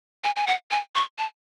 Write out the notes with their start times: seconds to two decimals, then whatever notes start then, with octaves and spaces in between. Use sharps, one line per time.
0.24 G#5
0.36 G#5
0.47 F#5
0.71 G#5
0.95 C#6
1.18 A5